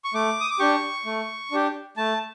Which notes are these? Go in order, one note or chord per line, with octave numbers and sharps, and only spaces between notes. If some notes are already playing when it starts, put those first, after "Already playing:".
C#6
A3 D6
D#6
D6
D4 G4 C#6
A3
D4 G4
A3 A5